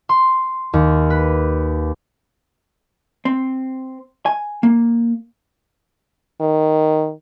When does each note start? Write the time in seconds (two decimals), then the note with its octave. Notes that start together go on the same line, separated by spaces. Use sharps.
0.09 C6
0.73 D#2
1.10 B4
3.25 C4
4.26 G#5
4.63 A#3
6.41 D#3